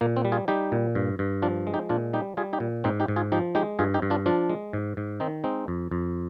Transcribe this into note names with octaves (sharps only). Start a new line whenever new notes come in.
A#2 A#3
C4
G3
F4 G#4
G3 D#4 G4
A#2
G2
G2
F3 D4 F4
G#3
D#4 G4
A#2 D4 F4
G3 D#4 G4
G3 F4 G#4
D#4 G4
A#2
G#2 C4 D#4
D#4 G4
G#2
F4 G#4
F3 D#4 G4
G#3 D#4 G4
G2 F4 G#4
D#4 G4
G2
D4 F4
F3 D4 F4
G#3
G#2
G#2
D#3 C4 D#4
G#3 C4 D#4
F2
F2